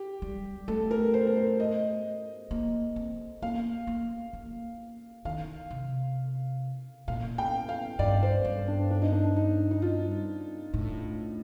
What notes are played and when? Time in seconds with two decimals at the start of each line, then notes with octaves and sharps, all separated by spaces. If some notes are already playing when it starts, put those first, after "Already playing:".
Already playing: G4
0.22 G3
0.68 A3 A4
0.91 A#4
1.14 C5
1.27 A#4
1.36 C5
1.60 D#5
2.51 A#3
2.96 C4
3.42 A#3 F5
3.87 A#3
4.33 A#3
5.25 D#3 F5
5.71 C3
7.08 A#2 F5
7.38 G5
7.69 F5
7.99 G2 D5
8.23 C5
8.45 G2
8.68 D4
8.91 D4
9.02 D#4
9.13 D4
9.36 D#4
9.71 D#4
9.82 F4
10.74 A2